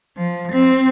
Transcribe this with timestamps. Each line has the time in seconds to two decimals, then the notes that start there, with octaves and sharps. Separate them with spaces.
0.17 F3
0.52 C4